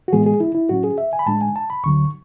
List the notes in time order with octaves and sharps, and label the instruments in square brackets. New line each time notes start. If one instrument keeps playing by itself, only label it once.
[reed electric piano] F#4
A2 E3 G#3 B3 G#4
G#4
E4
E4
A2 F#3 C#4 F#4
G#4
E5
G#5
B5
A2 G#3 D4 A5
G#5
A5
B5
D2 D3 F#3 C#6